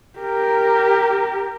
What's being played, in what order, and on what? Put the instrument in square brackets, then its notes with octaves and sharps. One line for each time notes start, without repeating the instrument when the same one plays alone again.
[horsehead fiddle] G4 A#4